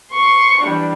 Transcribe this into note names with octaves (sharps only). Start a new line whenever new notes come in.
C6 C#6
E3 G3 D4